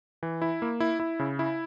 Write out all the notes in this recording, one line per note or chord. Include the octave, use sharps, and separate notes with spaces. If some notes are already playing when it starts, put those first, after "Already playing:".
E3
E4
A#3
E4
E4
C#3
E4